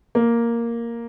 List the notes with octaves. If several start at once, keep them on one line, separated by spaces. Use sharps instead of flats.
A#3